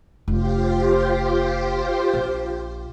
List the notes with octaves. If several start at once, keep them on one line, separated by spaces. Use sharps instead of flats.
F1 F4 G4 C5
A#1